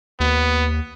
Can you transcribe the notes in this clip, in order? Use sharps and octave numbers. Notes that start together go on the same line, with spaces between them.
D#2 B3